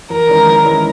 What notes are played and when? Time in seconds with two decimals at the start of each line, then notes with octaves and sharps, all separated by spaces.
0.10 E2 A#4
0.28 D#3 G#3 C#4 E4
0.46 E2
0.64 D#3 G#3 C#4 E4